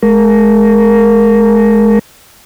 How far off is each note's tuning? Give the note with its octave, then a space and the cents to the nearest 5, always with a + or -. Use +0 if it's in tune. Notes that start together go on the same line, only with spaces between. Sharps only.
G#3 +25 A#4 +0